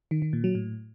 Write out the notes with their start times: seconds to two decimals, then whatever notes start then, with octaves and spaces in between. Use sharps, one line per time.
0.11 D#3
0.22 D#3
0.33 A#2
0.44 F#3
0.55 A2